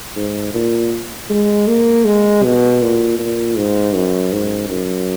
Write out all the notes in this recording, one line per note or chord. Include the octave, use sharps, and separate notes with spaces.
G#2
A#2
G#3
A#3
G#3
B2
A#2
A#2
G#2
F#2
G#2
F#2